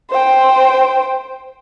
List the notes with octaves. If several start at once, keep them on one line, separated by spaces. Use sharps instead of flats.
C5 G5